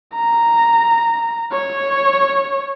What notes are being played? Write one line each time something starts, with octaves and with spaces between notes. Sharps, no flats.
A#5
C#5